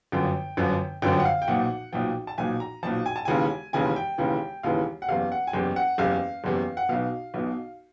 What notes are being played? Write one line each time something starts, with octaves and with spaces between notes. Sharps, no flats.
G1 F#2 D3 F3 G5
G1 F#2 D3 F3
G1 F#2 D3 F3 G5
F#5
F5
G5
B1 A#2 F3 F#5
B1 A#2 F3 G5
A5
B1 A#2 F3 G#5
A#5
B1 A#2 F3 A5
G#5
A5
E1 D#2 C#3 E3 G#5
E1 D#2 C#3 E3 G#5
G5
E1 D#2 C#3 E3
E1 D#2 C#3 E3 F5
F#5
F#1 E2 C3 F5
F#5
G#5
F#1 E2 C3 G5
F#5
F#1 E2 C3 F5
F#1 E2 C3
F#5
B1 B2 F5
B1 B2